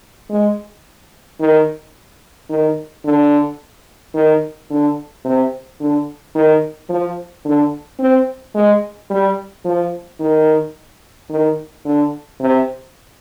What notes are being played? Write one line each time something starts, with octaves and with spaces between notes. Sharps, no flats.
G#3
D#3
D#3
D3
D#3
D3
C3
D3
D#3
F3
D3
C4
G#3
G3
F3
D#3
D#3
D3
C3